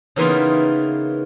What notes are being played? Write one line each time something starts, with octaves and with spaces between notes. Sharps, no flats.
C#3 E3 A#3 B3 D#4 F4